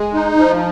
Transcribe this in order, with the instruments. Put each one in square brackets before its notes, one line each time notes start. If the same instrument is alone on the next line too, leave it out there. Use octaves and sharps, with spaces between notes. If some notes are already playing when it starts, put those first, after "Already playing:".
Already playing: [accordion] G#3
D#4
F3